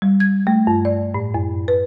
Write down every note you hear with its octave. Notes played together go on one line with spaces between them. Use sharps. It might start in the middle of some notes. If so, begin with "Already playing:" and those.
G3
G#6
A3
G2
D5
A2
F#2
B4